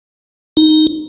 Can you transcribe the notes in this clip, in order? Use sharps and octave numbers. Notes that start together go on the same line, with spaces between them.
D#4